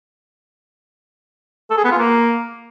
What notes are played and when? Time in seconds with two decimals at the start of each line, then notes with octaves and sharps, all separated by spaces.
1.70 A4
1.77 G#4
1.84 B3
1.91 F4
1.98 A#3